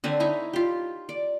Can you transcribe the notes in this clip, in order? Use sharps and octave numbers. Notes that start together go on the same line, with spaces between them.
D3 C4 B4 C#5
D#4 E4 C#5
F4 G4
D5